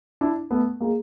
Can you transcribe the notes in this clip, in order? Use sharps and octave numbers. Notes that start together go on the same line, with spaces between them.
D4 E4
A3 B3
G#3 A#3